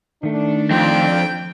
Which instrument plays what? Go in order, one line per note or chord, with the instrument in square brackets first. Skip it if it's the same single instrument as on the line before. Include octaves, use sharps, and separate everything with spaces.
[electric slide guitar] D#3 A3 [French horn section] D4
[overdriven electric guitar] F2 C4 [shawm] G5